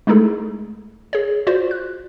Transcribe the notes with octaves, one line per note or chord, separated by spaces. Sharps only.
G#3 A3 D#4 E4 G#4 A4
G#4 C#5
F4 F#4 C5 D5
F#6